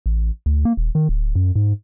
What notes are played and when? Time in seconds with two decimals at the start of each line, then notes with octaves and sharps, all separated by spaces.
0.06 A1
0.46 D2
0.65 A#3
0.77 D#1
0.95 D#3
1.09 D1
1.36 F#2
1.56 G#2